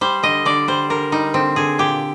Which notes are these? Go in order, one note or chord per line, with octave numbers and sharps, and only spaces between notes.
G3 C5
D3 D#5
D3 D5
G3 C5
D3 A#4
G3 D#4
D3 C4
D3 G#4
A#2 G4